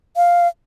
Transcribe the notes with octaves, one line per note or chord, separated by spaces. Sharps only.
F5